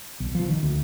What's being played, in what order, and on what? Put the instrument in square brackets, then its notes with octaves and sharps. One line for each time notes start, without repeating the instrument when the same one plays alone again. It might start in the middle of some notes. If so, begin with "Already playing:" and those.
[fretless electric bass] B1
F3
D#3
D2